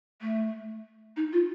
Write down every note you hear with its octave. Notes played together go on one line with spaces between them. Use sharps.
A3
D#4
F4